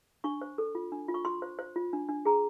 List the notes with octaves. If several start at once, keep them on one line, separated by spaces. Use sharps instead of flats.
D4 C#6
C5
A4
F4
D4
F4
C#6
F4 C6
C5
C5
F4
D4
D4
G#4 A#5